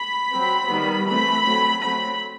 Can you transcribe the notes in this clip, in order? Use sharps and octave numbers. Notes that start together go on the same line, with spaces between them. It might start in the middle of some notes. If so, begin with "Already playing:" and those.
Already playing: B5
F#3 C4
D#3 G3 B3
E3 A3 C4 B5
F#3 A3 C4
F#3 A3 C4 B5